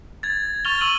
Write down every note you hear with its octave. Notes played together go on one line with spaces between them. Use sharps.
G#6 A6
C#6 F6 A6 F7 G7
C#6 E6 F6 D#7 F#7